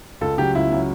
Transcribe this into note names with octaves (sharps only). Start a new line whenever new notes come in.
C#2 A4
C#3 F#3 C#4 G4
C#2 E4
C#3 F#3 C#4